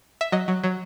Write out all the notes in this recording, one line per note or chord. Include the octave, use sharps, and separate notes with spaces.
E5
F#3 D#5
F#3
F#3